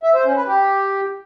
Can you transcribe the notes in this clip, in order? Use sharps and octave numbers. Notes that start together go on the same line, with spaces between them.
E5
C5
C#4
B4
G4